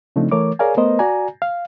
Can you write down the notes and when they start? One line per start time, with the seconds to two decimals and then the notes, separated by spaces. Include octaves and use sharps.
0.16 C#3 F3 A3 C4 D4 D#4
0.31 E3 A3 A#4 C#5 D6
0.59 G#4 A#4 C#5 D5 F5 G#5
0.77 A3 B3 A#4 C5 D#5
0.99 F#4 D5 G#5 A#5
1.42 F5